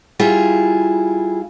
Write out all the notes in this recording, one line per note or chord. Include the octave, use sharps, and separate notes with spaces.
G3 E4 F4 G#4